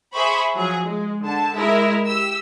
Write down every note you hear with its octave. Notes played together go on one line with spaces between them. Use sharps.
G#4 C5 E5 B5 C#6
F3 F#3 G#4
G#3
D3 A5
G#3 E4 A#4 E5
G4 E6